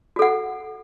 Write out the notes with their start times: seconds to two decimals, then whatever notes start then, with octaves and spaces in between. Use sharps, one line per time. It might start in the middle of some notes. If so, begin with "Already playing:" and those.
0.16 F#4
0.19 A4
0.22 F#5